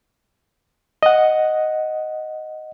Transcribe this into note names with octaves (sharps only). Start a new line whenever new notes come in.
D#5 F#5